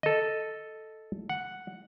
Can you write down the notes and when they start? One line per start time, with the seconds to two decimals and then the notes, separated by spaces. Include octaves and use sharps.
0.03 A4 D#5
1.30 F#5